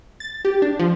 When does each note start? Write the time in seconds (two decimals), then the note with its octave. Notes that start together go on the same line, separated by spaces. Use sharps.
0.20 A6
0.45 G4
0.62 D4
0.79 F3